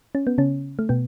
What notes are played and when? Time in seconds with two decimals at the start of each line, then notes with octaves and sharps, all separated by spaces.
0.15 C#4
0.27 B3
0.38 C#3 C#4
0.79 A3
0.89 B2 B3